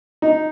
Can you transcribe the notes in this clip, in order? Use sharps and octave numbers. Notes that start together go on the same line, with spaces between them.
D#4